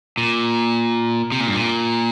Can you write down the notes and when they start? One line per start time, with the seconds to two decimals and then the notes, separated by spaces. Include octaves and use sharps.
0.18 A#2
1.32 C3
1.40 A#2
1.47 G2
1.54 A#2